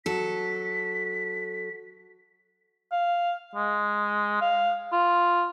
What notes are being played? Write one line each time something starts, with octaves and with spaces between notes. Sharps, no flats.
F#3 A4 B6
F5
G#3
F5
F4